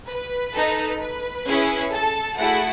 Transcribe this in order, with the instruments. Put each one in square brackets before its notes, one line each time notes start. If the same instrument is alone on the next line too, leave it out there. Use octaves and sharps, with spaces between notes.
[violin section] B4
D#4 A4
B4
C#4 E4 G#4
A4 A5
A3 E4 F#4 G#4 F#5